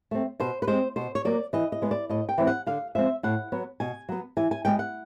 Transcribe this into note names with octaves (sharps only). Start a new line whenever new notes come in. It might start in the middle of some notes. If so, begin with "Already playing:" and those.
A3 C4
B2 C5
B4
G#3 C4 C5
B2 C5
C#5
F#3 A#3 D5
E3 D#5
D#5
G#3 B3
D5
A2 D#5
G5
E3 G#3 C4
F#5
D3 F5
F3 G#3 C4 E5
A2 F#5
F#3 B3
B2 G#5
F#3 B3
E3 G#5
G#5
G#3 B3 G5
F#5